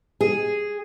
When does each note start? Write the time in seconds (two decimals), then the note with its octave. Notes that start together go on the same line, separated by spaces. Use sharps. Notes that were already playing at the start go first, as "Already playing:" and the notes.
0.21 G#4